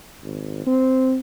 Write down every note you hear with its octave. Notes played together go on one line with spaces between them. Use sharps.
G#1
C4